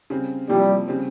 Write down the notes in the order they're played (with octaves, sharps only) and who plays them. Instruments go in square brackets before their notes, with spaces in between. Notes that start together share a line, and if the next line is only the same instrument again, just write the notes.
[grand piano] C#3 G3 C4
[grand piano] C3 F3 A#3 E4 [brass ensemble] G3
[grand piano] C#3 G3 C4